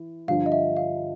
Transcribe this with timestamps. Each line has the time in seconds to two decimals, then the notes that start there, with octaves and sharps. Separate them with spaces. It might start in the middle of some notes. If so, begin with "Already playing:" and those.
Already playing: E3
0.28 G2 D3 F3 F5
0.46 D#5
0.52 E5
0.77 F5